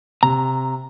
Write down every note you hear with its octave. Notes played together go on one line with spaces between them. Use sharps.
C3 A#5